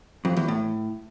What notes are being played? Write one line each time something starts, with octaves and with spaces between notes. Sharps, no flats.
F2
E2
A2